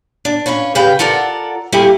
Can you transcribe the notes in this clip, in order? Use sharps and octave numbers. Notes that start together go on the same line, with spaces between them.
D4
C#4 F4 B4 C#5
C#3 G3 B4 F5 G5
F4 A4 A#4 D5 F#5
G3 A3 A#3 E4 G4 G#4